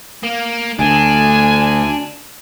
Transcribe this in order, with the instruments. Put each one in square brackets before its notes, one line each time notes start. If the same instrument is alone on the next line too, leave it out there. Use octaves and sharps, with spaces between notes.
[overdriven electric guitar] A#3
[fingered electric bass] D2 [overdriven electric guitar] D4 [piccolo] G#5